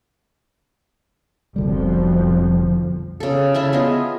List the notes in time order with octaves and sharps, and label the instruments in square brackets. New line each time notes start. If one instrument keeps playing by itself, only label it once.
[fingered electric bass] F1 D3 G3 [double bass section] B1 F2 F3
[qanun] C#3 A4
C#3 E4 E5 A5
B3 F4 G#4 D#5